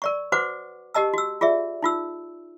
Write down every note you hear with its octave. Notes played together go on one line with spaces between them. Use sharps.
A#4 D5 C#6
F#4 B4 C5 F#5 D6
G4 A#4 D#5 A5 E6
F#4 E6
F4 G#4 D5 E5
D#4 F4 E6